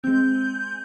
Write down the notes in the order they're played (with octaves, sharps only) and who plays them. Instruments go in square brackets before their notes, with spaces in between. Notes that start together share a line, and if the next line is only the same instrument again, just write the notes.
[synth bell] G#3 C4 [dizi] G6